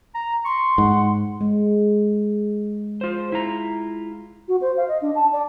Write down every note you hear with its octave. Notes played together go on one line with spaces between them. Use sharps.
A#5
C6 C#6
G#2 F#5
G#3
F4 C5
E4 F4 A#5
F#4
C5
F5
D#5
D4
A5
D5